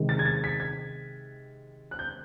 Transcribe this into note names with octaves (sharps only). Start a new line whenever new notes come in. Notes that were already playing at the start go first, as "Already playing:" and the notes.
Already playing: C3 D#3 G#3
A6
G#6
A6
B6
G#6
F#6
G6